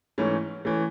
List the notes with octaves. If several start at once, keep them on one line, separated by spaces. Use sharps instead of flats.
G#2 E3 A3 C#4
E3 A3 C#4